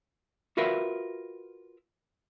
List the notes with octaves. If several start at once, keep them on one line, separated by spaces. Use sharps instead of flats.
F4 F#4 A#4 B4 E5 F5